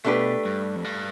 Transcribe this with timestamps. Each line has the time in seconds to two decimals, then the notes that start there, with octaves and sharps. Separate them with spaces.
0.04 B2 A3 D4 G4 B4
0.45 G2
0.75 F2
0.84 G2